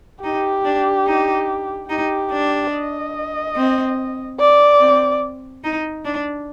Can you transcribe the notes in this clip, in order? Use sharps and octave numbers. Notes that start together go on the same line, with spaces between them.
D#4 G4
D4
D#4
D#4 G4
D4
D#5
C4
D5
C4
D#4
D4